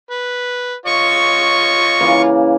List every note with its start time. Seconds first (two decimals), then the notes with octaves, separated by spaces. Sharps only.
0.11 B4
0.86 F4 C#5 D#5 C#6
2.00 C#3 E3 A#3